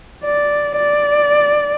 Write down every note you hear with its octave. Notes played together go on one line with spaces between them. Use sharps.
D5
D5